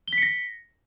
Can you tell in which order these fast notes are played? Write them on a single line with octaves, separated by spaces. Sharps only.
G7 B6 C#7 A#6